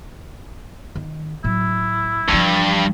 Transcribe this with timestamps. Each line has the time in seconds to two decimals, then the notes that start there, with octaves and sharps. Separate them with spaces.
0.96 D#3
1.44 A2 F#3 E4
2.29 G2 E3 F3